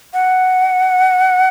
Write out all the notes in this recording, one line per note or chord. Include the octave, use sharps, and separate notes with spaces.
F#5